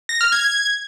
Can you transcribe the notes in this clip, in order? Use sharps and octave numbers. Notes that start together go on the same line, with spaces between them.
A#6
F6
G#6